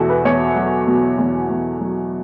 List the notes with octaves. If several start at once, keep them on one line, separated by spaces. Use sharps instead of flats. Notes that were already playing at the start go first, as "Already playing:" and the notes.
Already playing: E2 B2 E4 F#4 A4
B4
E2 C#5
F#3
B2
E2
E2
F#3